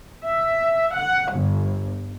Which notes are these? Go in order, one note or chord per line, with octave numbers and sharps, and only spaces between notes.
E5
F#5
G1